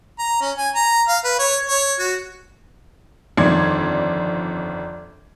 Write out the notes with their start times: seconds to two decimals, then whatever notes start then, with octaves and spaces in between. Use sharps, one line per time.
0.19 A#5
0.41 C#4
0.57 G#5
0.75 A#5
1.08 F5
1.24 B4
1.39 C#5
1.69 C#5
1.99 F#4
3.37 G1 F2 D#3 D5 C6 G#6